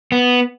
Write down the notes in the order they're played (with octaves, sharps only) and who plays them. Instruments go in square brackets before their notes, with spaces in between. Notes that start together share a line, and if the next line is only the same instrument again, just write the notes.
[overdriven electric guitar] B3